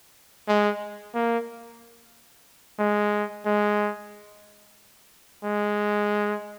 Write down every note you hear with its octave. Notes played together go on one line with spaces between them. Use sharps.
G#3
A#3
G#3
G#3
G#3